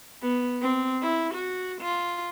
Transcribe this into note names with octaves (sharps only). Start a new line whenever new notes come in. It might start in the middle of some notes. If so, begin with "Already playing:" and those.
B3
C4
E4
F#4
F4